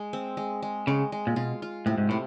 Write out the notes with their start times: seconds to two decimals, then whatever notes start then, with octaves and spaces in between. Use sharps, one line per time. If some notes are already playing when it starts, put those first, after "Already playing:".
Already playing: G#3
0.13 C4
0.37 G#3
0.62 G#3
0.87 C#3 G#3
1.12 G#3
1.27 A#2
1.36 B2 F4
1.62 F4
1.86 A2 C3
1.97 G#2
2.09 A2 C3